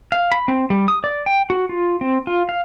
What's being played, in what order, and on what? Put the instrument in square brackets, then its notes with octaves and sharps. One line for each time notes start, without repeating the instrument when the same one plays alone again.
[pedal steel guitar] F5
B5
C4
G3
D#6
D5
G5
F#4
F4
C4
F4
F5